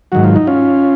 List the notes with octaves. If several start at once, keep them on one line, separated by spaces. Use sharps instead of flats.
G#2 D#3 F#3 F#4
F4
D#4
C#4 F4